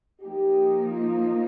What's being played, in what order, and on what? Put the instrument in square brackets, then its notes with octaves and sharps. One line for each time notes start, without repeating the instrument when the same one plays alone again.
[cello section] F3 A#3 D#4 [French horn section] G4
[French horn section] F4